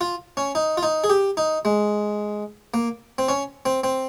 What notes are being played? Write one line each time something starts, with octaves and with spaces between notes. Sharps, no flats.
F4
C#4
D#4
F4
D#4
G#4
G4
D#4
G#3
A#3
C4
C#4
C4
C4